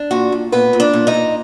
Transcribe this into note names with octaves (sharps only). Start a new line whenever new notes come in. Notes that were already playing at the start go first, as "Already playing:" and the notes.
Already playing: D4
A#2 F#4
A#2
A#2 B3 B4
A#2
D4 D5
A#2
D#4 D#5
A#2